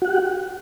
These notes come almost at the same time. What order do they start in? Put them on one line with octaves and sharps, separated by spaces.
F#4 F#5 G4